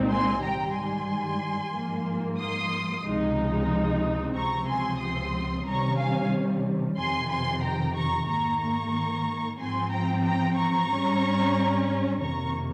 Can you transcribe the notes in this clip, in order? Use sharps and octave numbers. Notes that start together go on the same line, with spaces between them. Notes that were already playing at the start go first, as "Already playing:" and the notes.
Already playing: C2 A#2 G#3 C4 D#4
G#5 C6
G#2 D#3 G3 G5 A#5
G#5 C6
G#2 F3 A#3
C6 D#6
C#2 C3 F3 G#3 D#4
C#2 C3 F3 C4 A#5 C#6
G#5 C6
C6 D#6
C3 D#3 G3 C#4 A#5 C#6
F5 G#5
F2 C3 D#3 G#5 C6
G#5 C6
G5 A#5
A#5 C#6
G#2 D#3 A#3 A#5 C#6
A#5 C#6
G#2 F3 C4 G#5 C6
G5 A#5
G5 A#5
A#5 C#6
G#2 G3 C#4
F2 C3 D#3 A#3 A#5 C#6